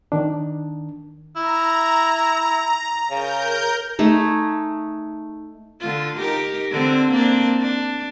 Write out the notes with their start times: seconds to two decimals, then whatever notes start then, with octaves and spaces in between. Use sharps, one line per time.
0.12 D#3 D4
1.36 E4 A#5
3.11 C#3 A#4 G6
3.99 A3 D#4 G#4
5.80 D3 F4
6.19 D#4 G4 A#4
6.71 D3 C4 D4
7.11 A#3 C4 D4
7.62 D4